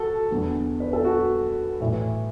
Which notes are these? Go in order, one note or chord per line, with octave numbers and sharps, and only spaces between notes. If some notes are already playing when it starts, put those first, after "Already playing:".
Already playing: F#4 A4
E2 D3
B4
A4
F#4
A2 E3